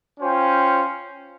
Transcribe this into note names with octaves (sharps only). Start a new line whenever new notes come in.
C#4 F4 C5 G5